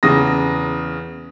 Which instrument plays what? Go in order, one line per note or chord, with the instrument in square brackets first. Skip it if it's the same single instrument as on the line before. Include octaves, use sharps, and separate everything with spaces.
[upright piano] E2 C#3 D#6 A#6